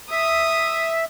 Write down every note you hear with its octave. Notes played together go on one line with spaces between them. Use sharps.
E5 D#6